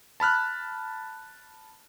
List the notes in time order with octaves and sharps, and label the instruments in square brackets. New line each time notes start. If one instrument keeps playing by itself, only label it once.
[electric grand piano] A5 B5 F6 F#6